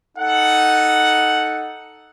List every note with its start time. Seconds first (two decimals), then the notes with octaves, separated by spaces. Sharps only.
0.18 D#4 A4 F#5